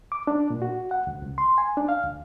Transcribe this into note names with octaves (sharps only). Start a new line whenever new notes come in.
D6
D4
A#2
F#4
F#5
D2
C#2
C6
G#5
D4
F5
D2